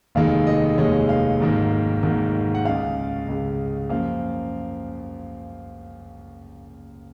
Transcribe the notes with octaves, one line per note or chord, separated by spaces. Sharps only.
F1 D#2 D#3 G#3 F5
D#5
F1 D#2 D#3 G#3 C#5
F5
G#1 G#2 D#3 A#3
G#1 G#2 D#3 A#3
F#5
C#2 C#3 G#3 F5
C#2 C#3 G#3
F#2 F3 A#3 F5